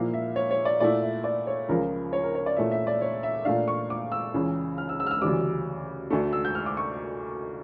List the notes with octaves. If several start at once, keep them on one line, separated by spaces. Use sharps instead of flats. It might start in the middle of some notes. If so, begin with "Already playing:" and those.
Already playing: A#2 F3 A#3 E4 F5
E5
C#5
C#5
D5
A#2 A3 E4 D5
E5
D5
C#5
C#2 C#3 F3 A#4
C#5
A#4
C#5
D5
A#2 A3 C#4 E4 E5
E5
D5
C#5
E5
A#2 A3 D4 F5
C#6
D6
E6
C#2 C#3 E3
F6
E6
E6
F6
E6
D2 C#3 E3 G3 D6
D2 D3 A3
E6
G6
F6
D6
C#6